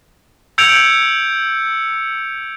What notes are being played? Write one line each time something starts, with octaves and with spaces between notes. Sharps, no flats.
E6 G6 G#6 C#7 D7 F7